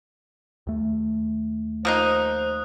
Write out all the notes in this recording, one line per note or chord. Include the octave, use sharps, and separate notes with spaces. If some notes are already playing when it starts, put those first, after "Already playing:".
D#2 A3
F3 A#3 D#4 C5 D#6 F#6